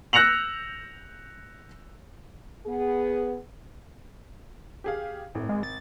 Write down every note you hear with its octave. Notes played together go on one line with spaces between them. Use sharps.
E6 F#6 A#6 C#7 F7 F#7
B3 G#4
G4 G#4 F5
G#1 A2
G#3
A6